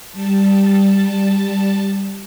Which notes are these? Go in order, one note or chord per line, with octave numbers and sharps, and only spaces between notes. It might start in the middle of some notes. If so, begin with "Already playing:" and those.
G3 A5